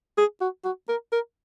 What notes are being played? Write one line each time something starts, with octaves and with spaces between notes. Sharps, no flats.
G#4
F#4
F#4
A#4
A#4